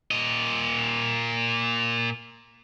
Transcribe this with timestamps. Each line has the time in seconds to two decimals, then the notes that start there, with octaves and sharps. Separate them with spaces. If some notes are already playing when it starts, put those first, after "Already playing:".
0.11 A#2 D#5